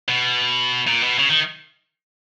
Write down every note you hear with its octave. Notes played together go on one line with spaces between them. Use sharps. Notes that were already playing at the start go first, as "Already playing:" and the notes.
B2
A#2
B2
C#3
D#3